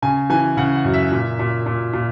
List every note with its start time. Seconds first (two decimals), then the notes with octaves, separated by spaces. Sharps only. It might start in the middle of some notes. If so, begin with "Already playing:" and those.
0.02 C#3 G#5
0.30 E3 G#5
0.57 C#3 F#5
0.75 F#5
0.84 F#2
0.94 E5
1.12 A#2
1.39 A#2
1.66 A#2
1.93 A#2